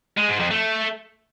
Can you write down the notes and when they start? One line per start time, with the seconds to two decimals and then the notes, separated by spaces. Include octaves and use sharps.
0.17 G#3
0.28 G#2
0.40 F2
0.51 A3